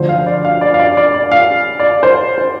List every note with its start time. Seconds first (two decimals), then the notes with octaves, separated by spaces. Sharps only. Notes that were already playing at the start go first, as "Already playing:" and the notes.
Already playing: D2 D3 F3 C5
0.09 F5
0.26 D5
0.45 F5
0.61 D5
0.74 F5
0.79 D5
0.97 D5
1.14 D5
1.32 F5
1.80 D5
2.03 C5
2.38 C5